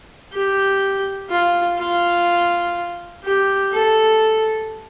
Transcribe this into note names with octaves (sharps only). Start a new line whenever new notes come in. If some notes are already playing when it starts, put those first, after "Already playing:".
G4
F4
F4
G4
A4